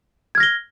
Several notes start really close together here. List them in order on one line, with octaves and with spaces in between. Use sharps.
G#6 F6 A#6 G7